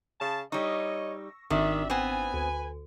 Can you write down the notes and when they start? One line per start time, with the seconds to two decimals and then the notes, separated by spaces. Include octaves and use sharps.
0.20 C#3 A5
0.52 G3 D#4 C#5 D#5 C#6 E6 A#6
1.50 G#1 D#3 D4 G4 D5 E5
1.90 B3 C4 B4 G#5
2.34 D2